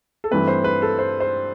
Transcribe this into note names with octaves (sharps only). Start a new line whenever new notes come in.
A4
G2 E3 A3 C4 B4
C5
B4
A4
C5
C5